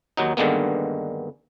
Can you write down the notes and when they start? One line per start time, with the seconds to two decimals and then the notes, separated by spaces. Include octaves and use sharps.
0.17 D#2 F#3 D#4
0.37 G2 D3 D#3 G#3 A#3 B3